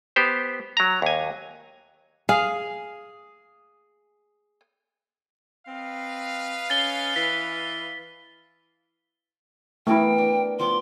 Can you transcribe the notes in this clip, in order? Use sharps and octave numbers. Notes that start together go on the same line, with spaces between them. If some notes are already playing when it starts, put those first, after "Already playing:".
B3 G4 C5
F#3 A#5
D#2 G#5
G#4 F5
C4 B4 D#5 F5
C#4 A6 G7
E3 B6
E3 A3 B3 E4 A#4 G5
D4
F3 B3 C6 D6